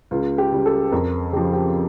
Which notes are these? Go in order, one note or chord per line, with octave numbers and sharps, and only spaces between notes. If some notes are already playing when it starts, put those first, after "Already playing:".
C#2 F4
G4
C#3 G3
A4
F2 A#4
C#3 F3 G4
G4